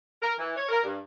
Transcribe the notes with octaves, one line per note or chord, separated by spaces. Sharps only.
A#4
E3
C#5
A#4
G2